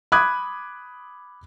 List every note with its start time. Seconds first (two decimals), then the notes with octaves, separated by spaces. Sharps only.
0.12 B5 D6 D#6 F#6 G#6